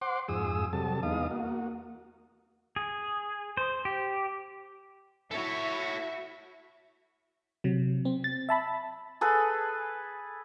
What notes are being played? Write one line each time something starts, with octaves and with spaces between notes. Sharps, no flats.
C5 F#5 C6 D6
F2 G#2 G#4 D#6 E6
C3 F#3 G3 A4 A5
E2 G#3 B3 D#4 F5 D#6
A#3 F#4
G#4
C5
G4
E4 F#4 A4 C#5 E5
C3 F#3
C4
A6
E5 A5 B5
G#4 A4 B4